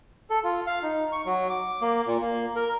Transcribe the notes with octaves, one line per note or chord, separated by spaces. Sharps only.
A4
F4
F5
D#4
C#6
F#3
D6
A#3
A#2
A#3
A#4